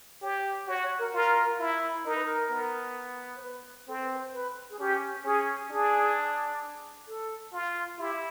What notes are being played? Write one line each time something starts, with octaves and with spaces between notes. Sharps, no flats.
G4 C#5
F#4 C#5
C#5
A#4
F4 A#4
E4
D#4 A#4
B4
A#4
B3
C5
B4
C4 A4
B4
B4
C5
B4
G#4
C#4 G4
C#4 G#4
D4 G#4
A4
F4
E4 G4